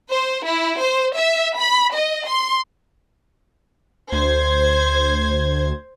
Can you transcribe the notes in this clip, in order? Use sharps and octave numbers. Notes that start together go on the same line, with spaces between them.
C5
E4
C5
E5
B5
D#5
C6
D2 C5 G#6